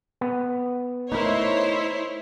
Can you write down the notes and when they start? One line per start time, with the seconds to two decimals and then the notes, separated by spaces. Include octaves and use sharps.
0.21 B3
1.12 A3 D#4 E4 A#4 C5 C#5